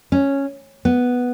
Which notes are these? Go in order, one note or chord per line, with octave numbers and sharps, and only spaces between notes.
C#4
B3